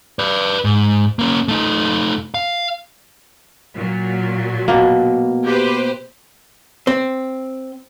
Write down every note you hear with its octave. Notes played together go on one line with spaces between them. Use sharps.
B4 D5
G#2
A#3 C#4
A3 D#4
F5
A#2 F#3
B2 A#3
G4 B4 C5
C4